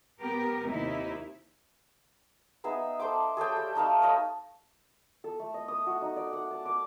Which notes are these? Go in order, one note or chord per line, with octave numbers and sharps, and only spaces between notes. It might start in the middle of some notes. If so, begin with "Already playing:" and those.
B3 G4 A#4
D#2 C3 D#4 E4
B3 D#4 G#4 E5
A4 C5 G5 D6
G#4 A4 C#5 G5
G3
A3 D#4 F5 A5
C#5 D#5 B5
A4
A3
D#5
D#6
F#4
D#4
D5
F#5
A5
D6